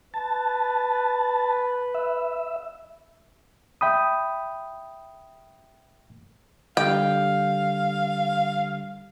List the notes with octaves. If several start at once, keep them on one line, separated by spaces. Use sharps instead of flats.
B4 A5
E5
E5 G5 B5 D#6
D3 G3 F5 G5